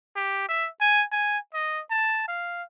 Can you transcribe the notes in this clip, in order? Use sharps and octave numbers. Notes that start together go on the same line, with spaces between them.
G4
E5
G#5
G#5
D#5
A5
F5